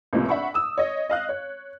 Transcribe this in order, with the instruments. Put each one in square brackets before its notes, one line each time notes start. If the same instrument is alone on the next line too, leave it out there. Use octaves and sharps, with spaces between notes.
[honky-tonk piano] C#2 A2 C3 F3 A#3
D4 E5 F#5 B5 C#6
D#6 E6
C#5 D#5
D#5 F5 F#6
C#5